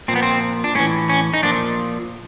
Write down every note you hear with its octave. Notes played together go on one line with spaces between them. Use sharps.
A#2 F3 B3 C4
C4
D4
A2 E3 C#4
C#4
D#4
A#2 F3 D4